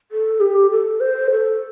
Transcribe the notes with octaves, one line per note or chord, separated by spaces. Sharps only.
A4
G4
A4
C5
A4